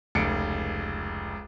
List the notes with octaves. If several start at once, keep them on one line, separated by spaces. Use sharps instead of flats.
F1 C#2 C#7 D7